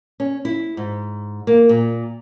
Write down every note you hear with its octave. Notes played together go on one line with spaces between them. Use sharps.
C#4
E4
G#2
A#3
A#2